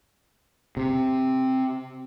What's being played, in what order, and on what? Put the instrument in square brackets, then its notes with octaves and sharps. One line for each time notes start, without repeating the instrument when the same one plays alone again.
[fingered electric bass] C3